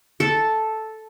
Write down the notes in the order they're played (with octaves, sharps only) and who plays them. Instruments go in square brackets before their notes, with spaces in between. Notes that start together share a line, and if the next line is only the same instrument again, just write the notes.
[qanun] A4